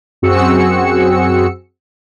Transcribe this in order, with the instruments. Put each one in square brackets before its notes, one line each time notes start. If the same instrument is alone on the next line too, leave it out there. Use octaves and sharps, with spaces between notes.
[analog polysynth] F#2 C4 F#4 G#4 E6 C#7